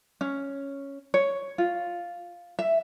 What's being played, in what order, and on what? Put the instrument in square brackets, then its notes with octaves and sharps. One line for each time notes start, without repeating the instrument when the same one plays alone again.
[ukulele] C#4
C#5
F4
E5